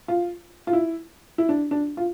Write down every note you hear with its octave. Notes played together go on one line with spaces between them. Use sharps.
F4
F4
E4
E4
D4
D4
F4